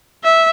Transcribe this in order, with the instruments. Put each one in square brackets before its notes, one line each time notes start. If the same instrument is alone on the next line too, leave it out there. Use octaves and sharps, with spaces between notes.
[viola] E5